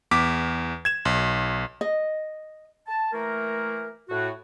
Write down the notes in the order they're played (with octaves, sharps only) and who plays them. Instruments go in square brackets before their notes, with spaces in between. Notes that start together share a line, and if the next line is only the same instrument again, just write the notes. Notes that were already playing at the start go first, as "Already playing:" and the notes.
[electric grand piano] E2 D6 B6
G#6 E7
B1
[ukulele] D#5
[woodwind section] A5
E3 A3 A#3 A#4
A2 F#4